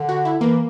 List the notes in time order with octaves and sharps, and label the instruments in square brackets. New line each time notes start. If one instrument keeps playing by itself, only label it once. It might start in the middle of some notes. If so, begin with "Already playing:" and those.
Already playing: [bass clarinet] D3
[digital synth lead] F#4
E4
[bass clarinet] E3 [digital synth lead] A#3